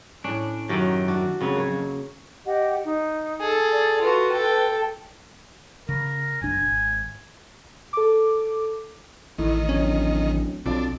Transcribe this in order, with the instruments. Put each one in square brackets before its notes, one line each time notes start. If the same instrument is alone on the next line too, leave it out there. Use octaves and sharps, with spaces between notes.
[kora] A2 C#4 [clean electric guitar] D4
[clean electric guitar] F#2 D#3 F#3 [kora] F#4 G4
[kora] D4 F#4 D5
[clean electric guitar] F2 F#3 [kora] C#3 B3
[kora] A#3 C#5
[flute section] G4 D#5 F#5
D#4
[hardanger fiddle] G#4 A4
[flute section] D5
[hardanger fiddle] F4 F#4 [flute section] B4
[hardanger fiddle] A4 G5
[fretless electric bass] C#3 [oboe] A#4
[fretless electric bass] F#1 B1 D4 [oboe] G#5
[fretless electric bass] G#1
[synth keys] A4 D6
[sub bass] A1 [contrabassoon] A2 [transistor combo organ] D#3
[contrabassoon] D1 [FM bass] C#4
[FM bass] B1 [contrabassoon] F2 [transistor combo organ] D4